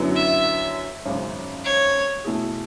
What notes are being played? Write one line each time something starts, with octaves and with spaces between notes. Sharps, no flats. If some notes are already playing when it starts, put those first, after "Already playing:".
Already playing: F#2 D3 F#3 B3 E4
E5
G#1 F#2 C#3
C#5
B2 A3 E4 G#4